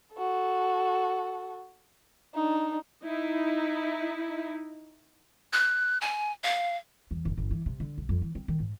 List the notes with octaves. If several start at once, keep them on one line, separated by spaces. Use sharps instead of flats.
F#4 A4
D4 D#4
D#4 E4
F#6
G#5
F5
E2
F#1
G1
E3
C3
D3
B1
F2
E3
C4
D#3
G#2